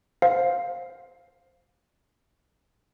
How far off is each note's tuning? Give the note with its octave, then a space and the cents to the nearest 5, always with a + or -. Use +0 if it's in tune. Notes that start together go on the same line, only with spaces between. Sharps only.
C5 +0 F5 +10